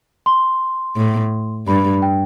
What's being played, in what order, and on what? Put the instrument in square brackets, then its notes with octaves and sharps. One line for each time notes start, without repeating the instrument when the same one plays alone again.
[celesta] C6
[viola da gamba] A2
[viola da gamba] G2 [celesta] B5
[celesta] G5